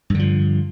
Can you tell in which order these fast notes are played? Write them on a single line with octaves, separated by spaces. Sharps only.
G2 D3 F3